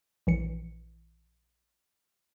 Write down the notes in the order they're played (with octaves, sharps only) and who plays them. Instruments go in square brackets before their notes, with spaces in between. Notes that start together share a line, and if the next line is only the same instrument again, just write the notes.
[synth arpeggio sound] A#1 E3 C#7